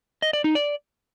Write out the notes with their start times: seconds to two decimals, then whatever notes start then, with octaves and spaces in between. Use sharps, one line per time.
0.22 D#5
0.33 D5
0.44 D#4
0.55 D5